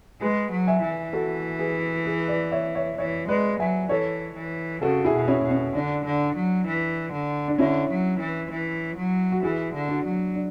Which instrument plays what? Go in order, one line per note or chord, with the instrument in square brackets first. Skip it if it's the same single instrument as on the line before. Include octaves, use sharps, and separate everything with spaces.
[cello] G#3 [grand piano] G#4 B4
[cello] F#3
[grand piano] E5 G#5
[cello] E3
[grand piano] F#4 A4
G#4 B4
G#4 B4
B4 D5
C#5 E5
C#5 E5
[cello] E3 [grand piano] C#5 E5
[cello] G#3 [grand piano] B4 D5
[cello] F#3 [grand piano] E5 G#5
[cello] E3 [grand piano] A4 C#5
[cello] E3
[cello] C#3 [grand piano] F#4 A4
[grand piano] E4 G#4
[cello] B2
[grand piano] C#4 E4
[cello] B2
[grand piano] C#4
[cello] D3 [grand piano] D4
[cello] D3
F#3
E3
D3
[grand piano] D4
[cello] D3 [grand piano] C#4 E4
[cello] F#3
E3
E3
F#3
[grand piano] F#4
[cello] E3 [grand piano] E4 G#4
[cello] D3
[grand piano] D4 F#4
[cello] F#3
[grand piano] D4